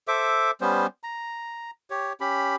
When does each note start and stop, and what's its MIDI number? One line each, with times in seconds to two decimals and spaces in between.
0.08 0.51 69
0.08 0.51 72
0.08 0.51 76
0.08 0.51 86
0.61 0.87 55
0.61 0.87 59
0.61 0.87 61
0.61 0.87 72
1.03 1.71 82
1.90 2.13 67
1.90 2.13 73
2.20 2.56 61
2.20 2.56 67
2.20 2.56 83